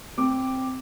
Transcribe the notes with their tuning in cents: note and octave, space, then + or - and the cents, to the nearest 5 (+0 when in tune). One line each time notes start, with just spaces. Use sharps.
C4 +0 D6 +0